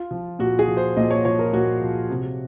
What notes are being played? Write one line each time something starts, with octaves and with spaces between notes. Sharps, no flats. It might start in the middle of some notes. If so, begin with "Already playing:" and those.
Already playing: F4
F3
A#2 F#4
G#4
F3
C5
A#2 D#5
C#5
F3 C#5
A#4
A#2 F#4
F3
C3